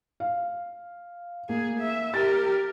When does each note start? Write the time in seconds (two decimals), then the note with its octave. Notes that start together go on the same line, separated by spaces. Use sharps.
0.20 F5
1.49 A#3 G#4
1.80 E5
2.14 G4 A#4 A6